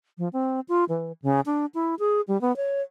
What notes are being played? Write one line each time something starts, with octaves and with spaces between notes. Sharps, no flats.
F3
C4
F4
E3
C#3
D4
E4
G#4
G3
B3
C#5